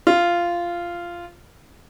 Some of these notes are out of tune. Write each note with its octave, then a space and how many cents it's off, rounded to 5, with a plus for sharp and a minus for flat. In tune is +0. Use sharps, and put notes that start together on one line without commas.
F4 -10